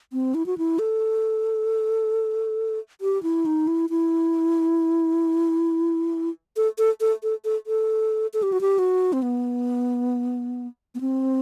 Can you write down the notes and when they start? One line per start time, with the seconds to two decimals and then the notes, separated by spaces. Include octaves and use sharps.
0.13 C4
0.35 E4
0.46 F#4
0.58 E4
0.79 A4
3.01 G4
3.23 E4
3.46 D#4
3.67 E4
3.90 E4
6.57 A4
6.78 A4
7.01 A4
7.23 A4
7.45 A4
7.67 A4
8.34 A4
8.43 G4
8.52 F#4
8.61 G4
8.79 F#4
9.13 C4
9.22 B3
10.95 B3
11.01 C4